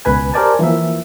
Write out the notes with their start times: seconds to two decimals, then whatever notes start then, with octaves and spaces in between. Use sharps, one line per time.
0.05 C#2 B2 B4 G#5
0.34 G4 A#4 C5 D5 G#5 A5
0.59 E3 F3 A#3 E5